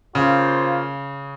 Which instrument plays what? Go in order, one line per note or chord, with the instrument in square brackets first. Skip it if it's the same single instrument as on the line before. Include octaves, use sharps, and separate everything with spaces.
[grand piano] C#3 [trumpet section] A#3 F4 C5